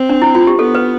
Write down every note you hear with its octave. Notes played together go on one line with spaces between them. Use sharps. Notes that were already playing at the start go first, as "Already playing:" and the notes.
Already playing: C4
D4
E4
F4
G4
B3 A4
B4